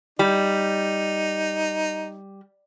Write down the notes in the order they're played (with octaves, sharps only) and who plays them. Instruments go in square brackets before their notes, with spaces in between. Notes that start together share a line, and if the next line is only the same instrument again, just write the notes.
[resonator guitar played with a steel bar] G3 [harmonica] D#4